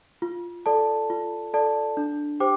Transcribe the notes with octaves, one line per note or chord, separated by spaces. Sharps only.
F4
A4 D5 A5
F4
A4 D5 A5
D4
G4 C5 G5 D6